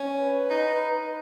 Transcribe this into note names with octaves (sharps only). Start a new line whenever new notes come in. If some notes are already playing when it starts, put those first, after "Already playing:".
Already playing: C#4
B4
D#4